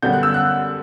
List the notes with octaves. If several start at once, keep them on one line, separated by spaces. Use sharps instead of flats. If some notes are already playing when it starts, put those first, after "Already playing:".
F#2 D3 G3 B3 G6
F#6
E6
F#6